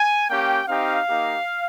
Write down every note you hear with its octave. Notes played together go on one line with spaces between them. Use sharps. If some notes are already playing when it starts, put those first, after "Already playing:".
Already playing: G#5
A#3 C#4 G4 G5
C4 D#4 G4 F5
A#3 D#4 G4